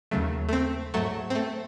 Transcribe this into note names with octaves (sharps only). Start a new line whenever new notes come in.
D#2 C#3 F#3 A3
A3
C4
G#2 F#3 A3
C4
A3